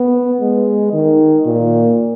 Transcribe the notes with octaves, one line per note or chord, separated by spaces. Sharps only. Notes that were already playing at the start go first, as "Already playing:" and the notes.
Already playing: B3
G#3
D#3
A#2